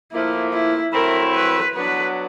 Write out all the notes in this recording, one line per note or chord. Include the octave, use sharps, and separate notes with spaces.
A2 F3 A#3 E4
E4
F#3 A3 C4 E4 A#4
B4
F#3 B3 D4 B4